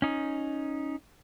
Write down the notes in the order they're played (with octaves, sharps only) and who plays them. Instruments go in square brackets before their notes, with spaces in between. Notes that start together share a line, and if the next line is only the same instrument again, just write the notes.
[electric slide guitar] C#4 D#4